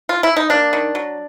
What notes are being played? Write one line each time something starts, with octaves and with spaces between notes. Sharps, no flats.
F4
E4
D#4
A#3 D4
D#3
F#3